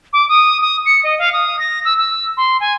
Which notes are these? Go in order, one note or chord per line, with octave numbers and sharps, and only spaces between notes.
D6
D#6
D#6
C#7
D#5
F5
D#6
A#6
E6
E6
C6
G#5